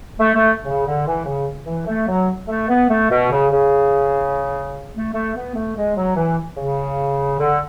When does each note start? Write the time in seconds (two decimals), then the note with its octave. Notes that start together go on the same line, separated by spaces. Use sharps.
0.19 A3
0.35 A3
0.65 C#3
0.86 D3
1.06 E3
1.26 C#3
1.66 E3
1.87 A3
2.08 F#3
2.48 A3
2.69 B3
2.89 A3
3.10 B2
3.31 C#3
3.51 C#3
4.94 A3
5.13 A3
5.35 B3
5.55 A3
5.76 G#3
5.96 F#3
6.15 E3
6.56 C#3
7.38 D3